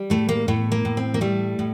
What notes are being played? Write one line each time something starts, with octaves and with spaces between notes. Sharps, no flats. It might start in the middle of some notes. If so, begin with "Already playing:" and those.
Already playing: G3
A2 A3
A#3
A2 A3
A#3
A2
C4
A#3
G3 A3
A2